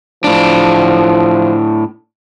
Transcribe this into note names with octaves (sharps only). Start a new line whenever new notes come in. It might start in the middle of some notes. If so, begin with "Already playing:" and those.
A2 F3 D4